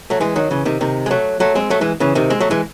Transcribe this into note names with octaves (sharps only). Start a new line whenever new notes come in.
F#3 A3
E3 G#3
D#3 F#3
C#3 E3
C3 D#3
C3 D#3
G#3
F#3 A3
F#3 A3
G#3 C4
F#3 A3
E3 G#3
C#3 E3
C3 D#3
G#3 C4
F#3 A3
E3 G#3